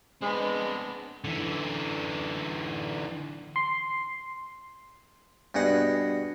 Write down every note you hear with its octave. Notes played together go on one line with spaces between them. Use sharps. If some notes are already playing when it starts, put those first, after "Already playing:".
G#3 B3 C4 D4 B4
D3 E3
C6
G2 B2 G#4 F#5